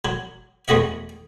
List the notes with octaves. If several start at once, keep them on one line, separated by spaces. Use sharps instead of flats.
F#3
E2 A3 F#4 D#5 E5